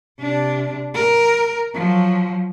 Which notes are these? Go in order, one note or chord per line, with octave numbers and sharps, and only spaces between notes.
C3 D4
A#4
F3 F#3